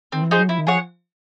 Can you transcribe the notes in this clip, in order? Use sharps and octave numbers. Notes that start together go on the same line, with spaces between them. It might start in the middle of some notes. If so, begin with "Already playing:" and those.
D#3 C4
E3
F3 D#4 G#4 C5
F#3
F3 E4
D#3
F3 G#4 C#5 F#5